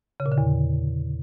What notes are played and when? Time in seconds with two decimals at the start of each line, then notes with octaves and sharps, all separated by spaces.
0.20 C#3
0.26 A#2
0.32 D3
0.38 E2